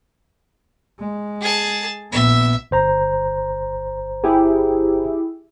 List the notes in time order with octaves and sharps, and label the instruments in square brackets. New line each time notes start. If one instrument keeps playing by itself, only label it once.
[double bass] G#3
[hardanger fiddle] G#4 A5
[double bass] A#1 B3 [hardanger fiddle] E5
[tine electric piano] G1 C5 A#5
[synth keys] E4 G4 G#4